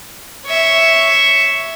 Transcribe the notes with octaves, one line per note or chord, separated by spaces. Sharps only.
C#5 E5